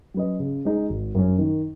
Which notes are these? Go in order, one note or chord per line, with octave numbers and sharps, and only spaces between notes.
F#3 C#4 B4 D#5
C#3
G#3 D#4 G#4
G#1
F#2 F#3 C#4
D#3